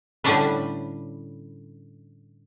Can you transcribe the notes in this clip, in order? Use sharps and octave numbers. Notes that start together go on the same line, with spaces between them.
A2 D3 G3 C#4 D4 B4